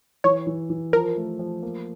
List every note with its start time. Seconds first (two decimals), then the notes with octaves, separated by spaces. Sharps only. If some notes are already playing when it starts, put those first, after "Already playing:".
0.24 E3 C#5
0.47 E3
0.70 E3
0.93 F3 A#4
1.16 A3
1.39 F3
1.63 A#3